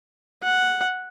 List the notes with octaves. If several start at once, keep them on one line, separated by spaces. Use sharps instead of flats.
F#5